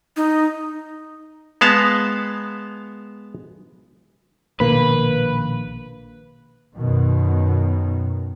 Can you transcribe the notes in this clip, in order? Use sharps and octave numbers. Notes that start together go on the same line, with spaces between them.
D#4
G#3 B3 F5 A5
A#1 B2 D#3 A#3 B4
F#2 B2 D#3